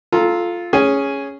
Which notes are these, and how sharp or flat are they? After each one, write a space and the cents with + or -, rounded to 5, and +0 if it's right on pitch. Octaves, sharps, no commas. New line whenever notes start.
F4 +0 A4 -15 A#5 +0
C#4 +0 G#4 +0